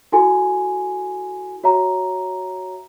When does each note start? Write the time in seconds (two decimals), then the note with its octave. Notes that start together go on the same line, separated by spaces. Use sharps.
0.12 E4 F#4 A4 G#5 C6
1.63 F#4 C#5 E5 A#5